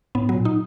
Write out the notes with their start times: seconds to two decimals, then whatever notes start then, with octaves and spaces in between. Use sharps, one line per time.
0.15 A2 B3
0.29 F#3
0.34 A#2
0.45 D#4